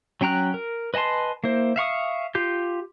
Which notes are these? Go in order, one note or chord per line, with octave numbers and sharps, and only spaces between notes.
F#3 C#4 G5 A#5 F#6
A#4
B4 D#5 G#5 A5 C6
A#3 E4 C5
E5 F5 C#6 D#6
F4 G4 G6